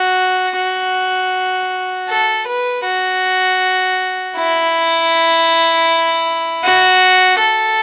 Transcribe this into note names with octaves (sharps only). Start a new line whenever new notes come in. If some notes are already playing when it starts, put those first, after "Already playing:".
Already playing: F#4
F#4
A4
B4
F#4
E4
F#4
A4